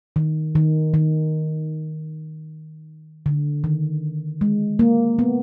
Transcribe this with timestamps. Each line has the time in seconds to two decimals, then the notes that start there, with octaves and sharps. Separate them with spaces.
0.16 D#3
0.55 D#3
0.94 D#3
3.26 D3
3.64 D#3
4.41 G#3
4.79 A#3
5.19 B3